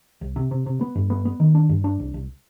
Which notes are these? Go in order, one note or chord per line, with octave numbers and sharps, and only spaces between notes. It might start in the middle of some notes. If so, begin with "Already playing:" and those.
C2
C3
C3
C3
B3
G2
B3
B3
D#3
D4
G2
D4
C2
C2